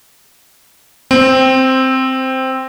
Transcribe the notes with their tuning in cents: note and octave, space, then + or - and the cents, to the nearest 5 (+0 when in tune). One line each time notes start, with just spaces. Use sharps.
C4 +0